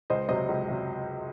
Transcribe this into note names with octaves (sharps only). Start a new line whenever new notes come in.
C#2 C5 D#5
C3 F#3 C5 D#5
C#2
C3 F#3